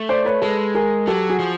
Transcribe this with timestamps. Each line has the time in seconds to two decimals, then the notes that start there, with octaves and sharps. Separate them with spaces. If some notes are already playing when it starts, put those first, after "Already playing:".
Already playing: A3
0.09 C5 D5
0.25 B4 C#5
0.42 G#3 A4 B4
0.75 G#4 A#4
1.07 F#3 G4 A4
1.29 F#4 G#4
1.39 F3